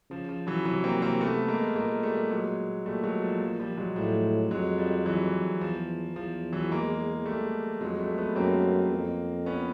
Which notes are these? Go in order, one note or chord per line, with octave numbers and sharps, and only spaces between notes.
C#3 F3
F3
E3 F#3
C3 E3 F#3
A#3 C4
A#3 C4
A3 B3
G#3 A#3
A#2 G#3 A#3
G3 A3
F#3 G#3
A#2 G3 A3
F#3 G#3
F3
F3
F3 G3
F#3 G#3
A2 F3 G3
F2 F#3 G#3
F3 G3
E3 F#3
E2 F3
E2 F3
E3 F#3
G#3 A#3
G3 A3
F2 F#3 G#3
G3 A3
A3 B3
F#2 A#3 C4
F2
B3 C#4